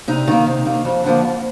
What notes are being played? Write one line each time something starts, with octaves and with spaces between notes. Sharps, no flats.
C3 D#4
D#3 A#3
C3
D#3 A#3
F2
D3 F3 A#3
F2